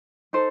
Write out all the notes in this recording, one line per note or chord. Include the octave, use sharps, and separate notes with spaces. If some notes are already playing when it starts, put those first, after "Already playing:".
D#4 A4 C5